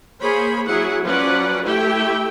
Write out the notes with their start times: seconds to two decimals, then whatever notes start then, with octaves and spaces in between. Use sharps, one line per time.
0.22 A#3 G#4 C5 C#5 B5
0.68 F#3 E4 G#4 F#5
1.04 F3 F#3 C#4 B4 D5 F#5
1.64 A3 E4 G4 E5 G5